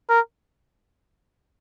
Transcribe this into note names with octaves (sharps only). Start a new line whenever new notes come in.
A#4